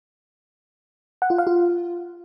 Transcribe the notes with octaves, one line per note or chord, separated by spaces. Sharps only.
F#5
F4
F5
F4